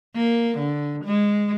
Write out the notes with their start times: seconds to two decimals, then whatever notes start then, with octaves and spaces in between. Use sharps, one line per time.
0.16 A#3
0.58 D3
1.05 G#3